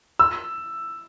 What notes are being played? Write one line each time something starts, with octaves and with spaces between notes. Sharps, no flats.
E6